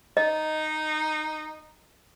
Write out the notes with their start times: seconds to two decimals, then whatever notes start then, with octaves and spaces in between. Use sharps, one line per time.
0.17 D#4 D#5